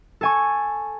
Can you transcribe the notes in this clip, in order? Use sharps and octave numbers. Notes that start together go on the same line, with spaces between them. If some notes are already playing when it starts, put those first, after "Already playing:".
A4 G#5 C#6